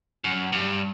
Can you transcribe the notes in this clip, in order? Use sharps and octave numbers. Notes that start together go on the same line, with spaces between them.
F#2
G2